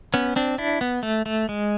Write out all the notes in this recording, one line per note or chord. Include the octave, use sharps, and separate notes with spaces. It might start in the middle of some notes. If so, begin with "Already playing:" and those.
B3 C#4
C4 D4
D4 E4
B3
A3
A3
G#3